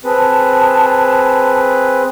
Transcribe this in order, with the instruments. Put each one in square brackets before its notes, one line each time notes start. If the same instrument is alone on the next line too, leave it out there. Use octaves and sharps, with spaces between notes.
[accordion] C4 G#4 B4 [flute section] A5